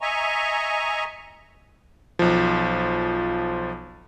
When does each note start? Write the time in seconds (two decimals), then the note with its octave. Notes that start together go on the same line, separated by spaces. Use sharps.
0.01 D#5 E5 G#5 A#5 C#6
2.19 B1 F3